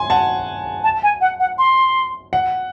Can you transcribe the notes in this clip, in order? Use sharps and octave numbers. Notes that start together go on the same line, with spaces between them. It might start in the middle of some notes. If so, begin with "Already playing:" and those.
Already playing: G#5 C6
F#5 A5
A5
G#5
F#5
F#5
C6
F#5